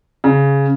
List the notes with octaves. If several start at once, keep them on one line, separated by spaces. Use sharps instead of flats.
C#3